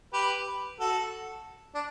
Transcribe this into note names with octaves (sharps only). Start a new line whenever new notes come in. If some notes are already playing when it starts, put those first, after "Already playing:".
G4 B4
F#4 A4
D4